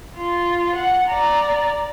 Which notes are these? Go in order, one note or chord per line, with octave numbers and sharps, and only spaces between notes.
F4
F#5
D5 A#5